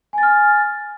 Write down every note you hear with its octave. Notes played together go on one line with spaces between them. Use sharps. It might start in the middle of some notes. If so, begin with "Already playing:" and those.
G#5 F6 A6